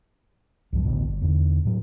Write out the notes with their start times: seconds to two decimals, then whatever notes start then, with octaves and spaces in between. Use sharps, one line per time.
0.73 C2 G2 F3
0.84 A1 D2 B2
1.08 G1
1.21 E2 D3
1.65 A2 F#3